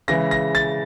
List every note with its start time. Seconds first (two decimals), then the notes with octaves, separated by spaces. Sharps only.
0.08 C#3 E3 G#3 A#6
0.31 A#6
0.55 A6